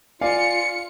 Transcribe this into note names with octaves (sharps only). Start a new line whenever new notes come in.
F4 D5 F5 G#5 C#7